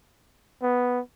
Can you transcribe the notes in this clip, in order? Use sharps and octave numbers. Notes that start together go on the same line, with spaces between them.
B3